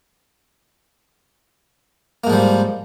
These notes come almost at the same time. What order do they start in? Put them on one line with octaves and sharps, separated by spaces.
A#3 G#2 F3 G3